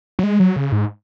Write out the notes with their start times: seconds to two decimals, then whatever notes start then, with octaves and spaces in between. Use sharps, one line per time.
0.19 F#3
0.23 G#3
0.40 F#3
0.56 C#3
0.72 G#2